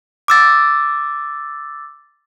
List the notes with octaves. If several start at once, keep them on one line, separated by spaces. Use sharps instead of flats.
D6 E6 A6